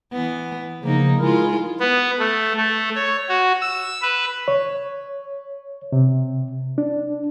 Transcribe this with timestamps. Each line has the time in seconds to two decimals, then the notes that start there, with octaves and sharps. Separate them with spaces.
0.13 E3 B3
0.84 C#3 F3 A#3 D#4
1.20 G#3 E4 F4 A#4
1.80 B3
2.19 A3
2.57 A3
2.95 C#5
3.29 F#4
3.61 E6
4.02 B4
4.48 C#5
5.92 C3
6.78 D4